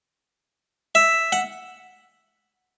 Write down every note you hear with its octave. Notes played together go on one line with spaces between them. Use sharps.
E5
F#5